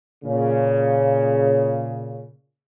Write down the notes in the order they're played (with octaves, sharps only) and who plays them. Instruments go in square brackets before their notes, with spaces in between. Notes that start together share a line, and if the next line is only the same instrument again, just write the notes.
[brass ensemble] A#2 C#3